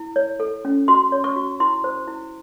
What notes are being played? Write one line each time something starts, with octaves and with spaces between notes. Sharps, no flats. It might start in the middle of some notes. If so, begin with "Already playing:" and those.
Already playing: E4
C#5
A4
C#4
F#4 C6
C#5
C#6
F#4
E4 C6
C5
E4